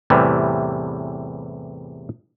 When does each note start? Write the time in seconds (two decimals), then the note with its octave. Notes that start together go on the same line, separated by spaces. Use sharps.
0.10 E2 A2 C3 E3 G3